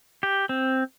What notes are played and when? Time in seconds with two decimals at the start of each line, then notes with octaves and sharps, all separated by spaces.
0.23 G4
0.49 C4